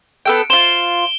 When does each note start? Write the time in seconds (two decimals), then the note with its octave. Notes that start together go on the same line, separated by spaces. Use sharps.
0.25 B3 A4 G5 D7
0.50 F4 C5 E7 G7